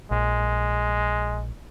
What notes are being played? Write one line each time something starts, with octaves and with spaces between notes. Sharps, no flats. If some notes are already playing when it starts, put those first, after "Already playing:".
A#1 G#3